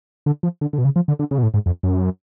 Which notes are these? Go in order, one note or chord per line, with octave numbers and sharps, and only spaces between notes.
D3
F3
D3
D3
B2
C#3
F3
D3
D3
C#3
B2
A2
G#2
F2
F#2